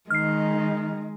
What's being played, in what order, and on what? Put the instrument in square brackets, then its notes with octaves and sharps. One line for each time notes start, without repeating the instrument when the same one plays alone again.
[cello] D#3 D#4 [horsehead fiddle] G#3 [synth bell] F6 C7